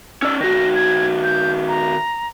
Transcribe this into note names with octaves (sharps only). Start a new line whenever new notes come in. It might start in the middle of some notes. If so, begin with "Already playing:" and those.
C#4 D5 E6
D#3 F#4 A#6
G#6
G6
A#5